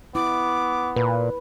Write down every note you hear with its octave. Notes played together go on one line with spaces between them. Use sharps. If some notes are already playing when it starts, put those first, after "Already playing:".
B3 E4 D6
A#2 B4